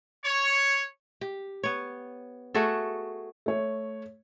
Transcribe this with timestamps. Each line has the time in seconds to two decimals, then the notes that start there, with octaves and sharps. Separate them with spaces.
0.25 C#5
1.21 G4
1.63 B3 C#5
2.54 A3 F#4 G#4 A4
3.46 A3 C#5